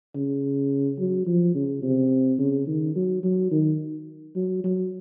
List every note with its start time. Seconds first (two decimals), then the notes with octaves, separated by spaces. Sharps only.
0.15 C#3
0.99 F#3
1.26 F3
1.55 C#3
1.83 C3
2.38 C#3
2.67 D#3
2.96 F#3
3.23 F#3
3.51 D#3
4.36 F#3
4.64 F#3